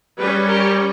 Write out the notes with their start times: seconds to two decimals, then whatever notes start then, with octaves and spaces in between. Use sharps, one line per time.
0.19 G3 C#4 G#4 B4
0.48 G4 A#4